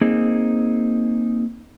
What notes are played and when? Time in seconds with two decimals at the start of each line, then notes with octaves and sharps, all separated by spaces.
0.01 A#3 C4 D#4 G#4